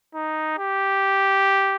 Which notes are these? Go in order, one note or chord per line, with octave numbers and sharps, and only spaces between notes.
D#4
G4